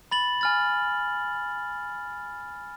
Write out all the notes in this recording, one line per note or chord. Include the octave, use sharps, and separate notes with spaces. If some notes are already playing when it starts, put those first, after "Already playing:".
B5 A6 F#7
G#5 F6 A6